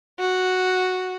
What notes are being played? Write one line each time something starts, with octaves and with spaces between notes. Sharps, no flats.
F#4